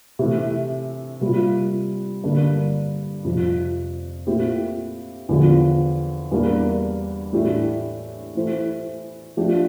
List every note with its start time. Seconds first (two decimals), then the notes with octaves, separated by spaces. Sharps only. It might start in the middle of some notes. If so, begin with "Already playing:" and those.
0.19 C3 E3 A3
1.21 C3 G3 A#3 F4
2.24 G2 D3 G3 A#3 D4
3.25 F2 C3 F3
4.27 A#2 A3 C4 E4 G4
5.29 E2 D3 F3
6.31 E2 E3 G3 A#3 D4
7.33 A2 E3 A3 D4 G4
8.35 E3 A3 E4 A4 C5
9.37 F3 A3 D4 G4